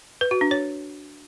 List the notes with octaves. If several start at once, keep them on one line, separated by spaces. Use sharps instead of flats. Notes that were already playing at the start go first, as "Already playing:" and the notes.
B4
F#4
D4
C#5